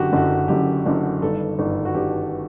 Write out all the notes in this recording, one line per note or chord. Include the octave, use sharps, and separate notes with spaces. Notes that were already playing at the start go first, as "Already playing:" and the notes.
Already playing: F#1 F#2 D3 F#4 G4
F#1 F#2 D3 F#4
F#1 F#2 D3 G4
F#1 F#2 D3
G1 G2 D#3 A4
G1 G2 D#3
F#4
G1 G2 D#3 G4